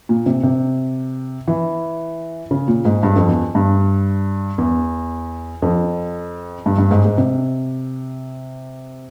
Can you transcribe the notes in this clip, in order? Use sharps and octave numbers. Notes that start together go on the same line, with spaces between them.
A#2
C3
C3
E3
C#3
A#2
G#2
G2
F2
E2
G2
E2
F2
G2
G2
G#2
G#2
C3